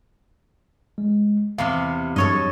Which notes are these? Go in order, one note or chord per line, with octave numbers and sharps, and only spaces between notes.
G#3
E2 C3 F5
G2 F#3 A4 C#5 D#5 C#6